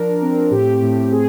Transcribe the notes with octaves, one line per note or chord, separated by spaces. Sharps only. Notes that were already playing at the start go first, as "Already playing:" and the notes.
Already playing: F3 D4 A#4
C4
A2 G4
A2
C4 G#4